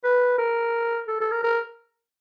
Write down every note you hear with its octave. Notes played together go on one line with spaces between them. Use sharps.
B4
A#4
A4
A4
A#4
A#4